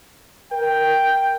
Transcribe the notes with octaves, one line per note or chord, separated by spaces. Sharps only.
A#4 G5